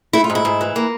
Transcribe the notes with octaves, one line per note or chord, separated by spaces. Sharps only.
A3 E4
F4
G#2
E4
G#2
E3
A#3